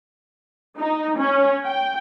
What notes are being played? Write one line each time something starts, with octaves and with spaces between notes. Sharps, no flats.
D#4
C#4
G5